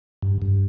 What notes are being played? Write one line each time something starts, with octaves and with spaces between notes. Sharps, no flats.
G2
G2